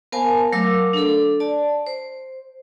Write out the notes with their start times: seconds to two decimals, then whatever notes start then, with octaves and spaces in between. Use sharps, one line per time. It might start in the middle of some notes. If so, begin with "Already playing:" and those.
0.12 B3 A#4 C5 F5 G#5 A5
0.52 F#3 A3 A#4 F5 D6 E6
0.93 D4 A4
1.40 D5 A5
1.86 C5